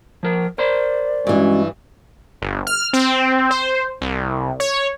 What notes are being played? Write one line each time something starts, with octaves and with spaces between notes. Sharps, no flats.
F3 A#4
A#4 C5 D5 C6
G2 E3 G#3 C#4 F#4
G1
F6
C4
C5
C2
C#5